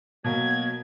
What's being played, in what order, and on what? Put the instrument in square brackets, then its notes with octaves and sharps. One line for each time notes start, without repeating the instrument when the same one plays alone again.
[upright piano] B2 [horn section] F#3 A#3 [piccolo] G#6